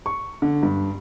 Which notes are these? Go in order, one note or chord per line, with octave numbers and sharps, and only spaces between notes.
C#6
D3
G2